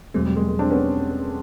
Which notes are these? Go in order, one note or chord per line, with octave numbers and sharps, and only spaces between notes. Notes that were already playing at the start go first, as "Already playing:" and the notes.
E2 B2 F#3 G#3 A3 C4
G3
G#3
G#3
C4 D4
B3 C#4